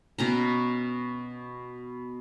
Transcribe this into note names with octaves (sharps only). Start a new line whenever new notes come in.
B2 C#4 A#5